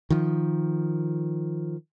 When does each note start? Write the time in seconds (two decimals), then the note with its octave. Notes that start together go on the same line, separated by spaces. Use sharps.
0.10 D#3 F3